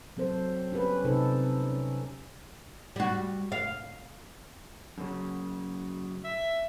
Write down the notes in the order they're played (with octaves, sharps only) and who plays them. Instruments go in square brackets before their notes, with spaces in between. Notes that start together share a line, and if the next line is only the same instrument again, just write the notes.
[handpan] F#3 C4 A4 C5
C#4 G4 B4
C3 D#4 A4 C5
C#4
[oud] G3 F#4
F5
[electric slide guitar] F#2 C#3
[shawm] E5